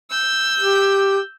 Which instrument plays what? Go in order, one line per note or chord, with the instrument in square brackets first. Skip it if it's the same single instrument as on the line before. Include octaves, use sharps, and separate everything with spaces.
[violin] E6 G6
[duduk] G4